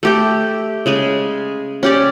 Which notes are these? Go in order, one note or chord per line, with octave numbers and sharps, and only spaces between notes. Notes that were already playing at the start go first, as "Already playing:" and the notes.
A3 G4 G5
C#3 G#3 G#5
C#4 G4 D5